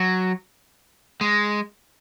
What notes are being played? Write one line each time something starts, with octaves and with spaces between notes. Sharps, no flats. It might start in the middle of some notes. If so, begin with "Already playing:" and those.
Already playing: F#3
G#3